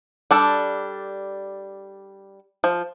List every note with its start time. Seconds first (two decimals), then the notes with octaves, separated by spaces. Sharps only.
0.31 G3 D4 A4
2.64 F3